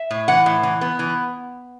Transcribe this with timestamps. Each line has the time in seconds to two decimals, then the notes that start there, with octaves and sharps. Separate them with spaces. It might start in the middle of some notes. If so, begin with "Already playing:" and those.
Already playing: E5
0.11 A2
0.28 E3 F#5
0.46 A2
0.63 E3
0.81 B3
0.99 E3